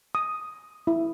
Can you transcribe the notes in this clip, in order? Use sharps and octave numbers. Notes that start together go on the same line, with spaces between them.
D#6
E4